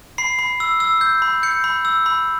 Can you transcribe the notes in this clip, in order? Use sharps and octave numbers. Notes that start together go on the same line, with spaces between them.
B5 C7
B5
E6
E6
G6
B5
G6 C#7
B5
E6
B5